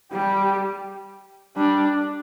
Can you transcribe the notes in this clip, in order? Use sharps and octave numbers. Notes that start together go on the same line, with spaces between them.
G3 G4
G3 D4